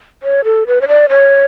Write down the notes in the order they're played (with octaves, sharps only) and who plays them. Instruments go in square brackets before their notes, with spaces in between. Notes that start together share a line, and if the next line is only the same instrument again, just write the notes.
[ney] C#5
A4
B4
C#5
D5
C#5